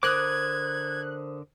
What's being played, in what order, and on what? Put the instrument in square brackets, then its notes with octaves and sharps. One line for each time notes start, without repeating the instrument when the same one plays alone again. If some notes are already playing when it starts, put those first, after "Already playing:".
[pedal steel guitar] D3 A#4 D6 [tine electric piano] C5 D#6 [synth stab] F#6 [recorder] G#6